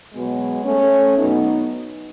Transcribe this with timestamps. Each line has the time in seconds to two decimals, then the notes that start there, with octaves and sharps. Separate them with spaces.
0.14 B2 F#3 G#3 B3
0.65 A3 C#4
1.17 B2 F#3 B3 D#4